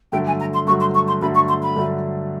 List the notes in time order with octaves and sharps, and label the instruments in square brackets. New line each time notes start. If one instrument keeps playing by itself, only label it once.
[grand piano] G2 D3 F#3 A3 [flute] G5
[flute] G#5
A#5
C6
[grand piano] G2 D3 F#3 A3 [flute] C#6
[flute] C6
C#6
C6
[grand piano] G2 D3 F#3 A3 [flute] B5
[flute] C#6
C6
B5
[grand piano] G2 D3 F#3 A3